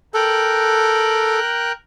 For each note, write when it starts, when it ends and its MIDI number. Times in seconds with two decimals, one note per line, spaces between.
0.14 1.40 69
0.14 1.72 70
0.14 1.72 79
0.14 1.72 90